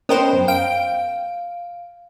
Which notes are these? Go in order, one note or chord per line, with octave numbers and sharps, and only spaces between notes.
B3 C#4 A#4 C5 D#5 G5
F#2
F5 G5 D7